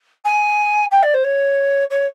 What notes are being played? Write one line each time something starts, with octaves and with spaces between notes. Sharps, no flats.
G#5
G5
D5
C5
C#5
C#5